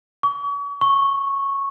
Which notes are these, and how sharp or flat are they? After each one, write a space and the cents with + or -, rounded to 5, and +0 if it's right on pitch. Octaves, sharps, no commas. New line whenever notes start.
C#6 +40
C#6 -10